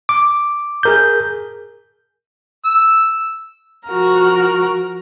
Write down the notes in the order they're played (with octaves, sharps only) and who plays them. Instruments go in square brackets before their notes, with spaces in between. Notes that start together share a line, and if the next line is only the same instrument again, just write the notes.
[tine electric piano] D6
G#4 A#4 G6
[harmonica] E6
[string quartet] F3 F#4 A#4 A#5 F6